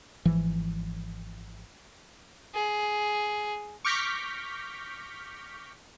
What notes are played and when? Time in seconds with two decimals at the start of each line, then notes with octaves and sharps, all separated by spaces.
0.25 G#1 E3 F3
2.54 G#4
3.85 C#6 D6 F6 G6 A#6 B6